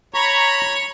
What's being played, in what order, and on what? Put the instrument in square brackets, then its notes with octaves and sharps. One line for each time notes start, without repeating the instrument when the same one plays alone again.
[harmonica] C#5 [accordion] A#5 B5 C#6